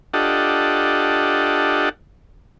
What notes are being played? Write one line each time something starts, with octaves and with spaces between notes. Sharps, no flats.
D4 F4 G4 A4 D#5 F#5